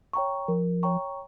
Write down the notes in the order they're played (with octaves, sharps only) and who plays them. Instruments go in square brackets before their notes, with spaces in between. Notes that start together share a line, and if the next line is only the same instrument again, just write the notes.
[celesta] C#5 G5 A#5 C#6
[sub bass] F3 [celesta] A#4
[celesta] C#5 G5 A#5 C#6